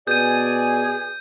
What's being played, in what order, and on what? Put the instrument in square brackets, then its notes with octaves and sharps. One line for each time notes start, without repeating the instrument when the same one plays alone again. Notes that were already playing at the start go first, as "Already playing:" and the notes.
[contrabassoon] B2 [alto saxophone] G#4 [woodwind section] D5 G#5 [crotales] G6 D#7